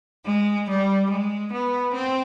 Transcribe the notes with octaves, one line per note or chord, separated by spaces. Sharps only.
G#3
G3
G#3
B3
C4